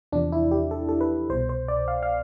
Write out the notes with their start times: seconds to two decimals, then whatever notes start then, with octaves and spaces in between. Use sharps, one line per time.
0.12 E2 C3 F3 D4
0.32 E4
0.51 G4
0.71 A4
0.89 A4
1.01 B4
1.30 C2 B2 C5
1.49 C5
1.68 D5
1.88 F5
2.03 F5